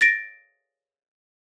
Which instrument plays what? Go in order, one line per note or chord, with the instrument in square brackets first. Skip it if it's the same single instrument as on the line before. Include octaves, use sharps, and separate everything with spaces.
[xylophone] A6 A#6 D7